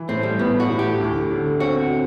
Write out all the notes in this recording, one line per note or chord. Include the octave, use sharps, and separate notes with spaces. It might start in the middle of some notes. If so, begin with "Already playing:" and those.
Already playing: E3
A2 C4
G3
A2 B3
F#4
A2
G4
D2
D3
C4 F#4